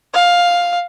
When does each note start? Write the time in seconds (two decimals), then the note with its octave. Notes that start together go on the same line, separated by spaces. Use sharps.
0.14 F5